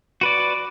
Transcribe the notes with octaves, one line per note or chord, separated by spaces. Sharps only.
F#4 B4 D5